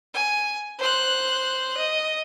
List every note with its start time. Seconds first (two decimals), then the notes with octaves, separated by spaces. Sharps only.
0.14 G#5
0.79 C5 F#6
1.77 D#5